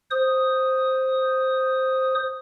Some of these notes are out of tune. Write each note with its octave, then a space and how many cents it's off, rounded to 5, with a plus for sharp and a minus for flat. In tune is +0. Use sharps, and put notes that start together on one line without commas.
C5 +0 D#6 +0